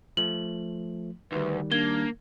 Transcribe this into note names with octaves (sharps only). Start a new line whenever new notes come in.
F3 A3 F#7
D2 D#3 G3 B4
A#3 D4 G#6 G7